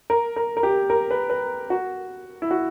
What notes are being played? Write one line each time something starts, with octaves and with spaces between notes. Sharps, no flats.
A#4
A#4
A#4
G4
A#4
B4
B4
F#4
E4
F#4